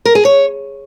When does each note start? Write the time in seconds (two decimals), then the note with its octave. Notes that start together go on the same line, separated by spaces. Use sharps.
0.05 A#4
0.15 G#4
0.25 C#5